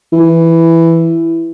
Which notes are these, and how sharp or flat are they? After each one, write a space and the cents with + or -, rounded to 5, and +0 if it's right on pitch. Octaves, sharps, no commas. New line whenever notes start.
E3 +5